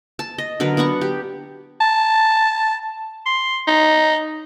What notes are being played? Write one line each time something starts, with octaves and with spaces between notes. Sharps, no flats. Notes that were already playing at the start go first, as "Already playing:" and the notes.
A5
D#5
D3 F#3 A#4 B4
B3 D4 F#5 C#6
G4
A5
C6
D#4